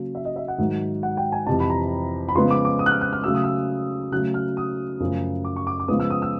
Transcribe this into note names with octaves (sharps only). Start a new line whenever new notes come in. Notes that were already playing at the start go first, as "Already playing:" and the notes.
Already playing: C#3 F#3 A#3
E5
D#5
E5
F#5
G#2 D#3 F#3
F#5
G5
G#5
F2 C3 E3 A5
B5
A#5
B5
C#3 F3 G#3 B3 C6
D6
D6
D#6
F#6
F6
F#6
F6
C#3 F#3 A3 E6
D#6
E6
C#3 F#3 A3 F#6
F6
D#6
F#2 C#3 F3 A3
D6
C#6
D6
D6
C#3 F3 G#3 B3 D#6
E6
D#6
E6